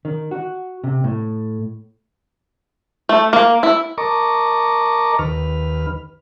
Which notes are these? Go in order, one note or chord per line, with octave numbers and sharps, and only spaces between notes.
D#3
F#4
C3
A2
A3
A#3
E4
A#4 D#5 A5 A#5 C#6 D6
D#2 B4 F6